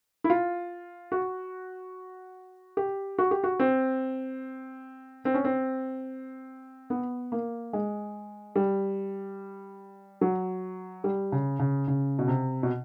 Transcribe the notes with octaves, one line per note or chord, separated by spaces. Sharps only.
E4
F4
F#4
G4
F#4
G4
F#4
C4
C4
C#4
C4
B3
A#3
G#3
G3
F#3
G3
C#3
C#3
C#3
B2
C3
B2